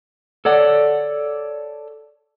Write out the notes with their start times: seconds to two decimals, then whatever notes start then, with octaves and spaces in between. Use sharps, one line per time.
0.45 A4 C#5 D5 F#5